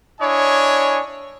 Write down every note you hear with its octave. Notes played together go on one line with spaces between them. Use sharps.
D4 E4 C#5 D#5 G#5